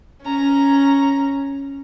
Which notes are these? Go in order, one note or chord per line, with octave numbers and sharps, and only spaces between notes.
C#4 A#5